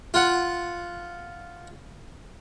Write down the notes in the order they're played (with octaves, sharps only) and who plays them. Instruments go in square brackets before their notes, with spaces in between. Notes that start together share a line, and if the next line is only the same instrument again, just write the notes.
[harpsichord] F4 F#5